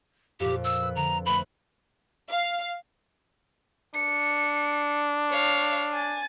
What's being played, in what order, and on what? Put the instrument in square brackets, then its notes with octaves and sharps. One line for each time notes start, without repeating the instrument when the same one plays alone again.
[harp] F2 A#2 [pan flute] G4
[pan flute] E6
[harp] B4
[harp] D3 [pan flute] A#5
[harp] A3 B4 C5 [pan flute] B5
[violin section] F5
[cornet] D4 [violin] C#7
[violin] C#5 F5
G#5 A6